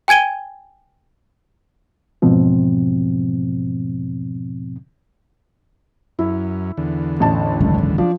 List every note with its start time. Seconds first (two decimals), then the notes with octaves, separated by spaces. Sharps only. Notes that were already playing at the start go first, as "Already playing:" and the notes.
0.08 G5 G#5 G#6 D#7 G7
2.22 E2 G#2 B2 F3 C4
6.19 F#2 E4
6.77 E2 D3
7.20 A1 A5
7.61 G#1 C#2 F#2
7.98 F3 D4